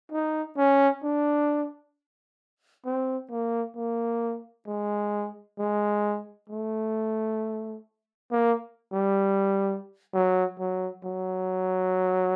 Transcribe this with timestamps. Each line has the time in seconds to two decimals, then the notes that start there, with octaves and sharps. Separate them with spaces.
0.12 D#4
0.57 C#4
1.03 D4
2.85 C4
3.31 A#3
3.76 A#3
4.67 G#3
5.59 G#3
6.50 A3
8.31 A#3
8.92 G3
10.14 F#3
10.59 F#3
11.04 F#3